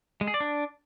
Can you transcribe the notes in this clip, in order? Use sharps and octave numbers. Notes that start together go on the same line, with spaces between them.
G#3
G#4
D5
D4